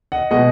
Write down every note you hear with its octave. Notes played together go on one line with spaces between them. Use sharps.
D#5 F#5
B2 G#3 D#5 F#5